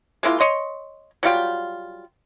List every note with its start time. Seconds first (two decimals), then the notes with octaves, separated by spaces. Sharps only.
0.23 G#3 A#3 E4 F4
0.40 C#5 D#5 C6
1.23 F#3 G3 F4 G5